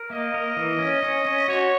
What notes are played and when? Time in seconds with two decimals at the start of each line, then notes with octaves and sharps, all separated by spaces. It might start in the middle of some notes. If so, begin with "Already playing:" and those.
Already playing: A#4
0.10 A#3 D#5
0.34 A#4
0.57 E3
0.79 C#4
1.03 C#4
1.25 C#4
1.48 F#4 C#5